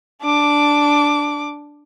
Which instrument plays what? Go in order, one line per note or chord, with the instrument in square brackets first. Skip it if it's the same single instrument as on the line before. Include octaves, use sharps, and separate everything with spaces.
[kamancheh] D4 D6